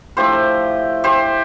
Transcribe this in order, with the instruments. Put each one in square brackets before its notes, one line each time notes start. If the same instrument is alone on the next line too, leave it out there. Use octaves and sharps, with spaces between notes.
[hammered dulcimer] A2 F3 A3 G4 C5
G4 C5